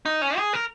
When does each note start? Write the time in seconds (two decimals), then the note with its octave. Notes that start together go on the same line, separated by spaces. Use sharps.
0.06 D#4
0.22 C#4
0.37 G#4
0.53 A#4